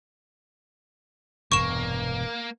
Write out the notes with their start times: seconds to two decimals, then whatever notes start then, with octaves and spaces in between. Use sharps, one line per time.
1.52 E1 G2 C3 A#3 C#6 E7